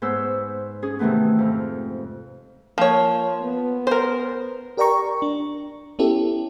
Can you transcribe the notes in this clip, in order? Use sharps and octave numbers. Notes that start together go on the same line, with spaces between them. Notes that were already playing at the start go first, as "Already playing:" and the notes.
G#2 B3 C5 C#5 E6
C#4 G#4 D#6
C3 D#3 E3 A3 B3
F2 G#2 F6
F3 A#3 C#5
B3
A#4 C5
G4 A#4 D5 G5 A#5 C#6
D4
B3 C#4 E4 G4 A4